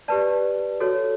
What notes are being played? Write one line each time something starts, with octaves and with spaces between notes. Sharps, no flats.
G4 B4 D5 A5
F#4 A4 C#5